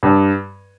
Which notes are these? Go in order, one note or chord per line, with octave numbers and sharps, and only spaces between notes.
G2